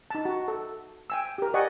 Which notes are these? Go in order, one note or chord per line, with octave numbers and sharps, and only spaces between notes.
D#4 A5
F#4
A4
G5 G#5 E6
G4 A#4
G4 D5 D#5 F#5 G#5 C#6